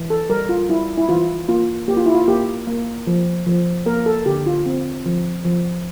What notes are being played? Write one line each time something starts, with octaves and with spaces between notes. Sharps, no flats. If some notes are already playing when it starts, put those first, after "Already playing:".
Already playing: E3
A4
G3 A#4
F4
G3 E4
E4
E3 F4
A#3 F4
A#3 G4
F4
E4
F4
A#3 G4
A#3
F3
F3
A#3 A#4
A4
D3 G4
F4
C4
F3
F3